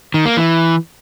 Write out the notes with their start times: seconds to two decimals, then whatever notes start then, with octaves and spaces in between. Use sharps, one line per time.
0.14 D#3
0.26 A#3
0.37 E3